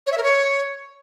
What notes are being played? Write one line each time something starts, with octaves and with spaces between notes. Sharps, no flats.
C#5
E5
A#4
C#5